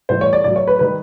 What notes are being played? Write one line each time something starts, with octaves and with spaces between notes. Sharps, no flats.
A2 E3 G3 C5
C#5
D5
A2 F#3 D5
C#5
B4
D#3 G3 B4